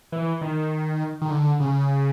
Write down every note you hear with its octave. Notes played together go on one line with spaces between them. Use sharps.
E3
D#3
D#3
D3
C#3